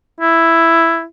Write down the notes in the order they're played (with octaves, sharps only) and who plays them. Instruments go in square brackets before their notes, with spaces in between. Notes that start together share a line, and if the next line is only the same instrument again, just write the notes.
[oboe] E4